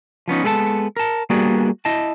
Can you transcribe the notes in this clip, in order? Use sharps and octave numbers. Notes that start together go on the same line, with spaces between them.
F3 B3 C#4 D#4
G#3 B3 A4 F5 A5
A#4 A5
G3 A#3 B3 D4 F#4 G#4
E4 D#5 A5